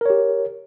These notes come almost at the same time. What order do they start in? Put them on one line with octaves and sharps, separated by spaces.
A#4 C#5 G4